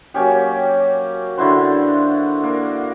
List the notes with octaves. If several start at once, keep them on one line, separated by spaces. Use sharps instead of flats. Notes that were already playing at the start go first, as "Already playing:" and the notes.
F#3 A#3 C#4 G4
D3 E4 F#4 C5
A#3